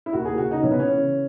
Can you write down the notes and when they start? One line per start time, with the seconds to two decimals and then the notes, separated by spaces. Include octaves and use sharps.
0.06 E4
0.13 D#2 F#4
0.25 G#4
0.38 C#3 F#4
0.51 D#4
0.63 E3 C#4
0.71 B3
0.79 C#4
0.88 C#3